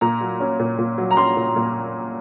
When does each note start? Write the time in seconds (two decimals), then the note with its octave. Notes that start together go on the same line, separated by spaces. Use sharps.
0.01 A#2 A#5
0.21 F#3
0.40 C#4
0.59 A#2
0.78 A#2
0.98 F#3
1.11 A#5
1.17 C#4 C6
1.37 A#2
1.56 A#2